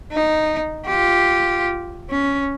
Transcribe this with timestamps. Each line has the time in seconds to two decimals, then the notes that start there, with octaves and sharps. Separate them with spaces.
0.12 D#4
0.86 F4 G4
2.10 C#4